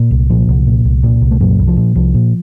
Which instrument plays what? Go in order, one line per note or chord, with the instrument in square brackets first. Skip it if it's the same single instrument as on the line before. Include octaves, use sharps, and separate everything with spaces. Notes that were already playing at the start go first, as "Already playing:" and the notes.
Already playing: [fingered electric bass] A#2
C2
A#2 F3
C2
A#2
C2
A#2
C2
A3
F#2 A#2 F#3
C2
F3
A#2
C2 F3
A#2